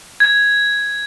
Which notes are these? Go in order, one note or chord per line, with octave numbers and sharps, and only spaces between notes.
G#6